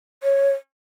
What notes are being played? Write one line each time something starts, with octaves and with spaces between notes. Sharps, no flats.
C#5